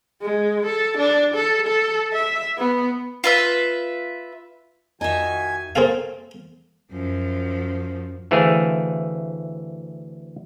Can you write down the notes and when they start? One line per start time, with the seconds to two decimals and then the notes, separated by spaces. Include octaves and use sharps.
0.22 G#3
0.65 A4
0.98 D4
1.34 A4
1.67 A4
2.13 E5
2.58 B3
3.24 F4 B4 E5
5.01 F2 D#3 D#4 F#4 E5 G#5
5.75 A#3 C4 G#4 A4 F5
6.92 F#2 F3
8.31 D2 E3 A3 C4 G#4 F5